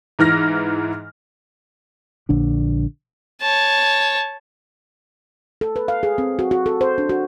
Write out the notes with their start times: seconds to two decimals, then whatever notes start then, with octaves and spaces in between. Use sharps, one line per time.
0.19 G#2 E3 F6 A#6
2.29 A#1 D3 D4
3.41 C#5 A5
5.61 A4
5.76 B4
5.88 F5
6.03 G#4
6.18 C4
6.39 F#4
6.51 F#4
6.66 A4
6.81 C5
6.98 D4
7.09 F#4